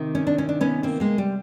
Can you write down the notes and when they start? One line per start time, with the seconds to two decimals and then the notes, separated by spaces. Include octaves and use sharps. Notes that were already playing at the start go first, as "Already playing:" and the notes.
Already playing: C3 D#3
0.15 C#4
0.27 D4
0.38 C#4
0.49 D4
0.61 B3 C#4
0.83 A#3 C4
1.00 G#3 A#3
1.18 G3